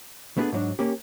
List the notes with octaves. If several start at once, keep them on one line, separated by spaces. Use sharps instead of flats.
A3 B3 D4 G4 G#4
G#2 F#3 D4
A#3 C#4 G4